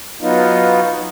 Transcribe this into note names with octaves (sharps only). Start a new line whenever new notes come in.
F#3 B3 D#4 F4